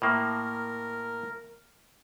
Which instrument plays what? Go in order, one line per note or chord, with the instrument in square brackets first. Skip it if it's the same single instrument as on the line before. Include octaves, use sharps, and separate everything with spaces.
[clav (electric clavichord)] A2 A#3 [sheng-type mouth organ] A#4